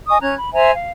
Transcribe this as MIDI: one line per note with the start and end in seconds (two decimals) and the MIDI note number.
0.08 0.17 75
0.08 0.17 80
0.08 0.17 85
0.08 0.17 87
0.21 0.35 61
0.21 0.35 82
0.21 0.35 90
0.21 0.35 92
0.37 0.53 83
0.54 0.71 72
0.54 0.71 76
0.54 0.71 80
0.54 0.71 82
0.75 0.91 77